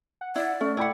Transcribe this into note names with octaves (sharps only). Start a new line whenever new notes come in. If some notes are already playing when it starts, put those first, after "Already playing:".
F#5
E4 D5
A3 C#4
E4 D5 F#5 G5 B5